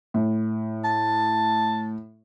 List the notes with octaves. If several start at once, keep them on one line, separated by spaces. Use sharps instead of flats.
A2
A5